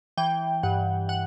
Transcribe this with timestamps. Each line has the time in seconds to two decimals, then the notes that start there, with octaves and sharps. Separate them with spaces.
0.17 E3 G5
0.63 G2 F#5
1.09 F#5